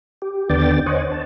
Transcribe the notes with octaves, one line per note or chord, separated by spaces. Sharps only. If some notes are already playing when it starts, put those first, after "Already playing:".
G4
D#2 D3 B3 D5 G5 A6
C5 C#5 D#5 F#5 G#5
A5